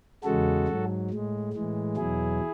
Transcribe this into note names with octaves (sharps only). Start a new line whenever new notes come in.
E2 C#3 G#3 F#4 A4
G#2 F#3
A2 G#3
A2 E3 G#3
E2 B2 F#3 E4 G#4